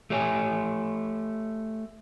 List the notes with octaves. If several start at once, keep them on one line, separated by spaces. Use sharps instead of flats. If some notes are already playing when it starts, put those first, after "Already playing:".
A3 G4 C#5 G#5